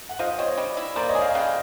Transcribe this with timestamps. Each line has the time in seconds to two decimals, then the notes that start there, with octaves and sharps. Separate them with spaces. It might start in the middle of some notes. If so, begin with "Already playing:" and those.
0.09 F#5
0.19 F3 D#5 F5
0.38 C4 C#5 D#5
0.58 G3
0.77 E4
0.96 A#3 C5 D5
1.09 C#5 D#5
1.15 G#4
1.22 D#5 F5
1.34 C#3 F5 G5